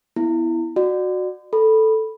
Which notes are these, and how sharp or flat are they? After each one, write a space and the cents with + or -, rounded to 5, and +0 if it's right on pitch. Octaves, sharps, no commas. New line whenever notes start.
B3 +0 E4 +0
F#4 -10 D5 +25
A4 +0 B5 -5